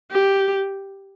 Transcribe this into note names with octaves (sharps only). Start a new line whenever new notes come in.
G4